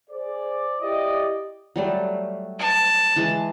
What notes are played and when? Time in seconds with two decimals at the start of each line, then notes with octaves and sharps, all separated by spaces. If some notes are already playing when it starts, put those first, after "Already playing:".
0.10 G#4 C5 D5
0.82 E4 G4 D5 D#5
1.76 F#3 G3 A3
2.59 A5
3.16 E3 G#3